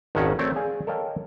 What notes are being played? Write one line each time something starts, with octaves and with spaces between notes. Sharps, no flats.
G#1 F2 D#3 C#4 F#4 F#5
A3 C4 C#5 D5 G5
G#4 D5 F5 G#5
A4 A#4 C#5 D#5 F5 G5